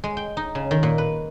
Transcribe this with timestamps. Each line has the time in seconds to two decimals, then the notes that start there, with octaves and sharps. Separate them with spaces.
0.04 G#3
0.17 G5
0.37 D#4
0.55 C#3
0.71 D#3
0.83 A#2
0.98 B4